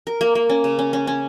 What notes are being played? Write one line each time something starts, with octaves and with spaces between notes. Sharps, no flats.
A#4
A#3
A#3
C#4
C#3
C#4
C#4
C#4